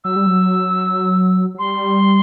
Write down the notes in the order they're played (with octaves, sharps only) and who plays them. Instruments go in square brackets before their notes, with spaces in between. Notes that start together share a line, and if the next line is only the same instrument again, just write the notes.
[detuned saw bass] F#3 [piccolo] E6
[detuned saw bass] G3
F#3
F#3
[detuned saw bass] G3 [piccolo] C6